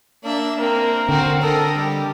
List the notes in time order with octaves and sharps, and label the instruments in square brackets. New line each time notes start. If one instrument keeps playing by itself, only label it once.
[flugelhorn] A#3 [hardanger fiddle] D4 E5
[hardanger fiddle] A#3 C4 [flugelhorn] A#4
[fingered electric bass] D3 [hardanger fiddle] C4 F#4
[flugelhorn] A4 [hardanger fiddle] A#4 D#5
[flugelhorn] G3 [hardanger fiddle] G4